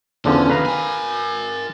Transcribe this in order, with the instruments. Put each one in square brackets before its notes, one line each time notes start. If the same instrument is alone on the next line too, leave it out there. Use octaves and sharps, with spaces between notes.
[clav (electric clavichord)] E2 D3 F3 [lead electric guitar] C#4
[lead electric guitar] E2 D#3 [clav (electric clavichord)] B4 F5 A#5
[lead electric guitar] A#4 G#5